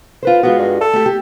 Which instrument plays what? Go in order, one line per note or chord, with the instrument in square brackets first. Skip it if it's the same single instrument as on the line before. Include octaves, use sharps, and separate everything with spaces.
[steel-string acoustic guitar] F4 B4 C5
[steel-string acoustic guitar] G#3 F4 F#4 [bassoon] B3
[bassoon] G2
A4
[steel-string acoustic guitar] A3 G4
G4